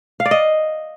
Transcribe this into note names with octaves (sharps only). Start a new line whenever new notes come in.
F5
D5
D#5